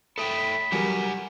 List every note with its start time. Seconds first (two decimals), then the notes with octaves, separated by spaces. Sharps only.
0.18 A4 E5 G5 B5 D#6
0.72 F#3 G3 G4 A#4 F#5 G#5